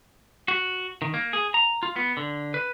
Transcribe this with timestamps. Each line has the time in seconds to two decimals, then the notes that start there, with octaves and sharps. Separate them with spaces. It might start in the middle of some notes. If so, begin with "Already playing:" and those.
0.48 F#4
1.02 D#3
1.14 A#3
1.33 G#4
1.54 A#5
1.83 F4
1.96 B3
2.17 D3
2.54 B4